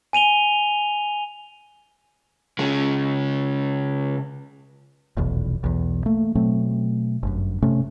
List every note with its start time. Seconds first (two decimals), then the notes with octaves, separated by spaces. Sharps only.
0.13 G#5 D#7 F7 G7
2.59 C#3 G#3
5.17 F1 B1 E2
5.64 B1 E2
6.06 A3 A#3
6.35 B2 F#3 A3 C4
7.23 G1 F#2
7.62 C3 A3 C#4